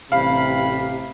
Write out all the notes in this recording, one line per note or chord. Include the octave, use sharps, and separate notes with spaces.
A1 G2 C3 F5 B5